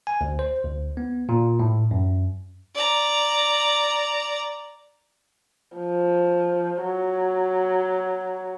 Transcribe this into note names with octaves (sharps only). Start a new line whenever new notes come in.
G#5
D2
C5
D2
B3
A#2
A2
F#2
D5 A#5
F3
F#3